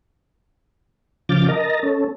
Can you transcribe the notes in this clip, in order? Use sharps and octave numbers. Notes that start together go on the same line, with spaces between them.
C#3 F3 D6 F6 G6 A6
A#4 D#5 A5 A#5
C#4 A4